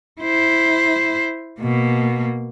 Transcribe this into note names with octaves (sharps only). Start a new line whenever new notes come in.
E4 C5
B2 A#3